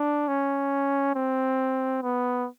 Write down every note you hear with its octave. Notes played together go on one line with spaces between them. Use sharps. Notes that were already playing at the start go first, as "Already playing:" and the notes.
Already playing: D4
C#4
C4
B3